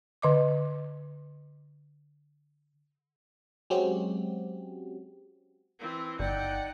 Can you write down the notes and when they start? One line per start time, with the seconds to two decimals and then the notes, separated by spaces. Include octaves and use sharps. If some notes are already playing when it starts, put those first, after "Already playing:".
0.22 D3 D#5 D6
3.70 F#3 G#3 C4 C#4 F#4 G4
5.79 E3 C4
6.19 G1 D#4 D5 F#5 G5